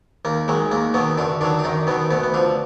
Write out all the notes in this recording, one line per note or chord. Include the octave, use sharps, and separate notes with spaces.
D#2 A#3
D#3 F#3 G#3
D#2 A#3
B2 D#3 F#3 B3
F#2 D3 D4
D3 D#3 F#3 D4
D4
F#2 D#3 D#4
B2 D#3 F#3 B3
D2 B2 B3
B3
D3 F3 D4